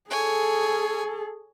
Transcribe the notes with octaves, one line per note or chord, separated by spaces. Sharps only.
G#4 A4 C#5 G#5